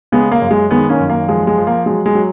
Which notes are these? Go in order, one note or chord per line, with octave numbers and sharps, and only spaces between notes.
C#3 G#3 B3
A#3
F#2
G#3
D#3 G#3 B3
A#3 C#4
F#2
A#3
F3 G#3
G#3
F3
A#3
F#3 G#3
G#3
F#3